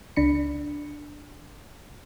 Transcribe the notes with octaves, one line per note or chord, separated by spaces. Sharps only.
C#2 D4 B5 C#7